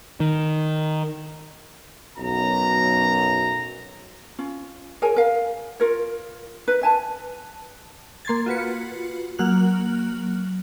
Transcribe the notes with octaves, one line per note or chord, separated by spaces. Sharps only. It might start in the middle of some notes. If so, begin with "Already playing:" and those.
D#3
B1 F#2 A#5
C#4 F4
G#4 A#4 C#5 G#5
A#4 F5
F4 A#4 C#5
D#4 B4
E5 G#5 A5
A#3 C6 G#6 A6
F4 F#4 B4 C#7
F#3 A#3 F6 F#6 F#7